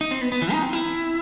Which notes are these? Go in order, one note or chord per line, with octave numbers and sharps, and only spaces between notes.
D#4
C4
B3
B3
E3
D#4
C4
E4